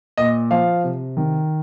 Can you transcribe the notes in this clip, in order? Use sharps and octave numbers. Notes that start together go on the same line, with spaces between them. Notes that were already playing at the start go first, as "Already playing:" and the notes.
A#2 D#5
F3 F5
C3
D#3